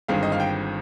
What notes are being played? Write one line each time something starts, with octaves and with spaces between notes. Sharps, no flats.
G1 G2 D#3 G#3 C4 F5
D#5
F5
G5